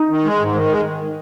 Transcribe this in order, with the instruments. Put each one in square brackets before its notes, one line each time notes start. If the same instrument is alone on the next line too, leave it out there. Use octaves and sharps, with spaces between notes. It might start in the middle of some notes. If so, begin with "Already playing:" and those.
Already playing: [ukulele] D#4
[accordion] D#3
G#3
G#2
D#3
G#3